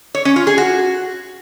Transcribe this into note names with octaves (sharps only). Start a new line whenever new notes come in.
C#5
C#4
F4
G#4
F#4